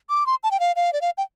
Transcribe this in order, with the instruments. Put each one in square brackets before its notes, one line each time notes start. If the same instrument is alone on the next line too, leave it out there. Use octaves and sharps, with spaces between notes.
[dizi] D6
C6
A5
G5
F5
F5
D5
F5
G5